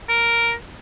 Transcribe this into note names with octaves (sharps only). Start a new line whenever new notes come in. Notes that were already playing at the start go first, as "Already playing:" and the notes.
A#4